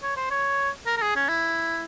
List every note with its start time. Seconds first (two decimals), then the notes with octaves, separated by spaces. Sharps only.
0.03 C#5
0.17 C5
0.31 C#5
0.86 A#4
0.97 A#4
1.02 G#4
1.16 C#4
1.29 E4